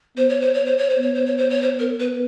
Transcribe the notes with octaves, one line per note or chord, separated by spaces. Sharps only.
B3 C5
C#5
C5
C#5
C5
C#5
C5
B3 C#5
C5
C#5
C5
C#5
C5
A#4
B4